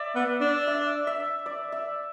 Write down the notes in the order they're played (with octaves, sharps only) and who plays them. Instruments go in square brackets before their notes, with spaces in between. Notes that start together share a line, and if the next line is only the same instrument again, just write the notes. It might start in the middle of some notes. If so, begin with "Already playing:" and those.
Already playing: [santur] D5 E5
[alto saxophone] B3
D4
[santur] E5
E5
D5
E5